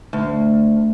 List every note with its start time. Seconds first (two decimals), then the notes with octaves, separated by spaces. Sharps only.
0.13 D2